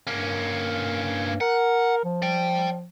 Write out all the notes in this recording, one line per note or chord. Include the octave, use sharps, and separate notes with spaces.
G2 A#3 C#4
A#4 F#5
F3
D5 G5